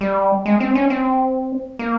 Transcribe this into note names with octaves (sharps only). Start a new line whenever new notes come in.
G3
G#3
C4
C#4
C4
A#3